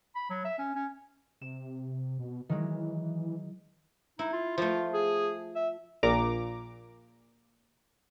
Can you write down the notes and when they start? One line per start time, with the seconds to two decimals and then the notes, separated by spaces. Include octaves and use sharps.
0.16 B5
0.30 F#3
0.45 E5
0.58 C#4
0.75 C#4
1.41 C3 E7
2.19 B2
2.49 D#3 E3 F#3 G#3
4.19 D#4 E4
4.33 F4
4.58 F3 A3 F4
4.93 G#4
5.56 E5
6.03 A#1 A#2 A#5 D6